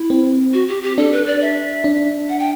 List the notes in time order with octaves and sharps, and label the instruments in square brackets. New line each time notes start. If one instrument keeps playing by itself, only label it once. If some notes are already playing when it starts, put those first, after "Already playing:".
Already playing: [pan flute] E4
[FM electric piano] C4
[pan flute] F#4
G4
G4
[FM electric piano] D4 [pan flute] A4
[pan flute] B4
D5
E5
[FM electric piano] D4
[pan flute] F#5
G5